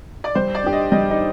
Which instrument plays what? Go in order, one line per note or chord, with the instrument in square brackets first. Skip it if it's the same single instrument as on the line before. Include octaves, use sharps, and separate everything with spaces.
[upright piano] D5
[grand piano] G3 [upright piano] C5
[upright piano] D5
[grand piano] D4 G4
[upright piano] D#5
[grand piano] G3 [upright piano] D#5
[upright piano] D#4